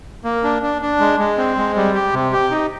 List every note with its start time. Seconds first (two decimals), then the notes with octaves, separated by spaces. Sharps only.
0.24 A#3
0.44 D4
0.62 D4
0.82 D4
1.00 G#3
1.19 G#3
1.38 C4
1.57 G#3
1.76 G3
1.94 G4
2.13 C3
2.33 G4
2.51 D#4